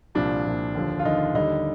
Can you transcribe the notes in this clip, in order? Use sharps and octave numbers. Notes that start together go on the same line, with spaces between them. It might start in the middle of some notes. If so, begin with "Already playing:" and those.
C2 A#2 F3 D4
C2 A#2 F3
D#2 D3 F3
F4
D#2 D3 F3 D#4
D#2 D3 G3 D#4